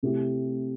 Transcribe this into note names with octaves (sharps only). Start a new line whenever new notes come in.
C3 A3 E4 G4